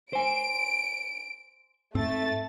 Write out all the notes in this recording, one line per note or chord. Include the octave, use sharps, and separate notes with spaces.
C5 G#5 D7
G#2 A3 C4 A6